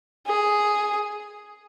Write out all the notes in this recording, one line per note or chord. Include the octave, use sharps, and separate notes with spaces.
G#4